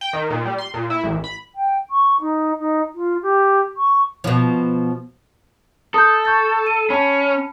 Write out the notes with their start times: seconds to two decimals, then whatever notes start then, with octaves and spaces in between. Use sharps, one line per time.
0.01 G5
0.13 D#3
0.30 A#2
0.45 G3
0.58 C6
0.74 A#2
0.90 E4
1.03 A1
1.24 B5
1.55 G5
1.90 C#6
2.21 D#4
2.59 D#4
2.95 F4
3.22 G4
3.77 C#6
4.24 B2 F3
5.94 A4 D#6 G6
6.25 C#6 G6 A6
6.67 D#7
6.90 C#4 A5 B5